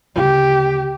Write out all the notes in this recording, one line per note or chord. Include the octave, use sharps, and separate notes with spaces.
D2 C#3 G4